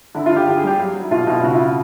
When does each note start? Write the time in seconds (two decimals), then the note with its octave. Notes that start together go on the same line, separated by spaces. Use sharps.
0.15 D3 E4
0.26 F4
0.31 D3
0.36 G4
0.47 D3 G4
0.57 G#4
0.64 G3 G4
0.79 F#3
0.95 F#3
1.03 E4
1.11 B2 F4
1.22 B2 E4
1.32 F4
1.43 C#3 F#4
1.50 E4
1.55 F4
1.60 C#3